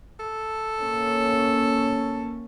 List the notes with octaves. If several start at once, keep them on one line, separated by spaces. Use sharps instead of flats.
A4
A#3 C#4